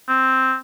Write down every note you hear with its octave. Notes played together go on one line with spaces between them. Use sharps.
C4